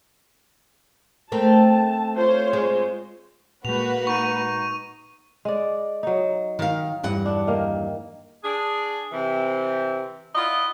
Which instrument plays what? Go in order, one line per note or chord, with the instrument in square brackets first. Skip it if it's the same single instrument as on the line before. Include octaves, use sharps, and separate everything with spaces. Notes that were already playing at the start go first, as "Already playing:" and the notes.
[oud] A3 C4 A#4 [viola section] A5
[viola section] F4 C5 C#5
[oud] G#3
[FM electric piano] A#2 G#3 [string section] A#3 F#4 B4 [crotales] F7
[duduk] D#4 [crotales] C#6 D#7
[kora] G#3 D5
F#3 D#4
[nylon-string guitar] D#3 F5
E2 G2 F#5
[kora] D4
D#3 A#3
[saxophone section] D4 G#4
C3 E3 C4
E4 F4 D5 D#5 F5 F#5